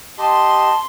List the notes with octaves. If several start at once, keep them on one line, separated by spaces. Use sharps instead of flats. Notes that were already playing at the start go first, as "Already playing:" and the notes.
G4 D#5 A5 C6